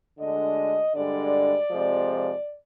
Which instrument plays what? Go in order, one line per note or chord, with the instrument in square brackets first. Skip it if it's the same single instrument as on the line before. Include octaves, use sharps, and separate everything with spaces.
[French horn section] D2 D3 G#3 D4 D#5
G2 D3 G#3 D5
F2 C3 F3 G#3